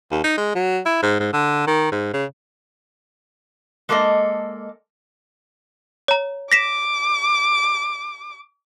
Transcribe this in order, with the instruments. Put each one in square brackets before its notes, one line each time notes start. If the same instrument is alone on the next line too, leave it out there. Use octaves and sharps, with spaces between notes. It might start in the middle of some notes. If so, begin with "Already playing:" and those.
[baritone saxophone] D#2
D#4
G#3
F#3
E4
G#2
G#2
D3
D#3
G#2
C#3
[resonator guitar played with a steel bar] G#3 A#3 A4 D5 D#5
[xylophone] C#5 A#5
[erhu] D6 [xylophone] A#6 B6 E7